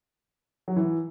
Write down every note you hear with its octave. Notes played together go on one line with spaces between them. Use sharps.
F#3
E3